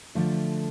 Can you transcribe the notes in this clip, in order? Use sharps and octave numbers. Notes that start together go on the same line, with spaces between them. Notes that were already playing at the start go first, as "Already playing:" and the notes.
D3 F3 A3